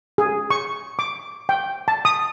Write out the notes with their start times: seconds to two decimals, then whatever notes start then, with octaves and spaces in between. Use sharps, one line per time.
0.18 G#4
0.50 C#6
0.99 D6
1.49 G5
1.88 A5
2.05 D#6